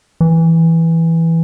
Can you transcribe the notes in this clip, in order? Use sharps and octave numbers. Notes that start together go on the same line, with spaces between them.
E3